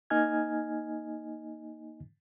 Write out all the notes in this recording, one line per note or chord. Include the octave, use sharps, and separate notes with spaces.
A#3 D#4 D#5 G#5 F6 G#6